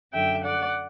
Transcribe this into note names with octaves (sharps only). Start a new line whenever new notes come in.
F#2 D3 E5 G5
D5 F#5